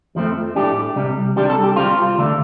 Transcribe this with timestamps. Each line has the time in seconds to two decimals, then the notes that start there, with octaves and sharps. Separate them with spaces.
0.15 F2 F3 A3 C4
0.55 A2 A3 D4 G4
0.96 C2 C3 G3
1.36 C2 C3 G3 D4 G4
1.50 A4
1.63 G4
1.76 C2 C3 G3 C4 F4
2.17 D2 D3 A3 D4